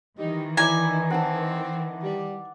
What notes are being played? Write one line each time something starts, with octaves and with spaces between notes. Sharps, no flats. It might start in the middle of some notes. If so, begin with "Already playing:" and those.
D#3 E3 G3 D#4
E4 D5 G#5 A#5
C4 F#5 A5
G3